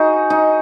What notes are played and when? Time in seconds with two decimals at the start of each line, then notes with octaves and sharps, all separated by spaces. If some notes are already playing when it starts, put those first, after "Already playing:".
Already playing: D#4 F#4 G#4
0.30 D#4